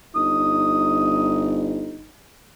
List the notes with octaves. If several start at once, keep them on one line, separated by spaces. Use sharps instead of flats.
G1 D#4 D#6